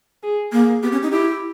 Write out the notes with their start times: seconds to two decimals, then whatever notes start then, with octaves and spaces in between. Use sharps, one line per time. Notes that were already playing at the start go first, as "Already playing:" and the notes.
0.23 G#4
0.52 A#3 G#4
0.83 B3 G4
0.92 C#4
1.03 D#4
1.12 E4 G4